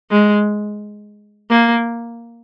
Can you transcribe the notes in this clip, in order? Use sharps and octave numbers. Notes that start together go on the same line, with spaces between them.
G#3
A#3